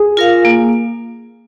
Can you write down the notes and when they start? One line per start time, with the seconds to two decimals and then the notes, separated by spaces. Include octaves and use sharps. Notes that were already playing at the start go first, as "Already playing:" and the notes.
Already playing: G#4
0.17 F4 A#4 F5
0.45 A#3